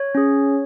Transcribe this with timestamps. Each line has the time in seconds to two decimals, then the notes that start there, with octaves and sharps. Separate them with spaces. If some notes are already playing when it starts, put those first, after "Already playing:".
Already playing: C#5
0.15 C#4 G#4